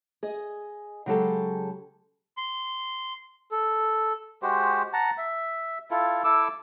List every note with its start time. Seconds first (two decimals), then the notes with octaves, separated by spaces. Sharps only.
0.23 G#4 D#5
1.06 C#3 F#3 G#3 G4 A4
2.37 C6
3.52 A4
4.43 G#3 F#4 G4 C5
4.93 F#5 A5 A#5
5.18 E5
5.91 E4 F4 A4
6.24 E4 A4 D6 E6